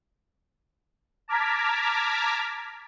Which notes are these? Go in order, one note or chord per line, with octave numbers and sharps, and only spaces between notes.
A5 A#5 D6 F6 G#6 B6